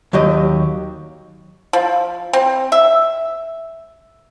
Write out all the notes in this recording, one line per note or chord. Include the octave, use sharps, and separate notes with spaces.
D#2 F#3 G4 D#5
F3
C4
E5